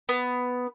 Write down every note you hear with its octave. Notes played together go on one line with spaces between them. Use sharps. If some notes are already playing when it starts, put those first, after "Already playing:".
B3